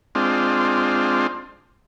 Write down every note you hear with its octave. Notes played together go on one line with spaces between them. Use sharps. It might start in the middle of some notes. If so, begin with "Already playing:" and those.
G#3 C4 D4 F4